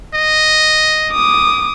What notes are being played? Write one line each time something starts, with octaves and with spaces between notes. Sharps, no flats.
D#5
D6 D#6